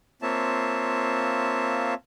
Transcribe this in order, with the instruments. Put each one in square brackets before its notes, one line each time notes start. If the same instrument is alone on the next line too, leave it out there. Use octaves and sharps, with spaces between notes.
[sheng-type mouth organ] A#3 C4 F4 C#5 E5 A5